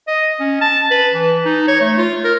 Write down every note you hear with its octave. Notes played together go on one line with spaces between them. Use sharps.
D#5
C#4
A5
B4
E3
D#4
C#5
A3
F4
A#4